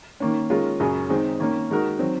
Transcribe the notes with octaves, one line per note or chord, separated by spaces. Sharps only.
D#3 A#3 C#4
D#3 G#3 C#4 F4 A#4
F#2 C#3 F#3 C#4 G#4
D#3 G#3 C4 D#4
D#3 A#3 C#4
D#3 G#3 D#4 F#4 A#4
D#3 F#3 C4